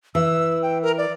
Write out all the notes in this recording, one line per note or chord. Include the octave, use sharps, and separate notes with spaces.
E3 E6
G5
A#4
D5